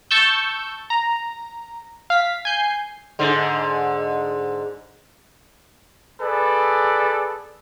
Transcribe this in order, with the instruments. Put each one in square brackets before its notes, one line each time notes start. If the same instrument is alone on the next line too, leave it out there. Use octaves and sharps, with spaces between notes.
[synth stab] A5 C#6 E6 G6
A#5
F5 B6
G#5 G6 C7
[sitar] G#2 D3
[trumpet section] G#4 A4 B4 D5